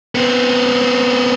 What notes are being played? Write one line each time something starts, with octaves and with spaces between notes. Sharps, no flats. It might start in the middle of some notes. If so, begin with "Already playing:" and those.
B3 C4